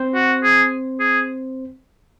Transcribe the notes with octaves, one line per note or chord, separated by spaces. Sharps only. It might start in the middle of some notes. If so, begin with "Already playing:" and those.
Already playing: C4 C5
F#4
G#4
G#4